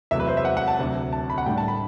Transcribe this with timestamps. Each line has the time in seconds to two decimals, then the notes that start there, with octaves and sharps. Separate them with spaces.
0.11 E2 C3 F#3 A3 E5
0.20 B4
0.28 C5
0.37 E5
0.45 F#5
0.57 F#5
0.68 A5
0.79 D2 C3 F#3
1.13 A5
1.30 B5
1.38 F#5
1.46 A2 G3 D4 G5
1.58 A5
1.68 B5